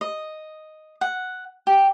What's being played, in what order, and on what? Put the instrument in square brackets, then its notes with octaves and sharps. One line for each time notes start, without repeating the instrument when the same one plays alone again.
[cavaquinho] D#5
F#5
G4